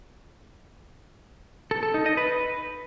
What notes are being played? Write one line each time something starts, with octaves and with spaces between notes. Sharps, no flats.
A4
A4
D#4
D#5
B4